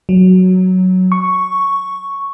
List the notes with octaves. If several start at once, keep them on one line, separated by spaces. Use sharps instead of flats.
F#3
C#6